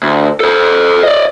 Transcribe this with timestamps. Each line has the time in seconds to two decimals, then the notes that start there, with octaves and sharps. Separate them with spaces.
0.03 D2
0.40 A4 C5
1.03 D5 D#5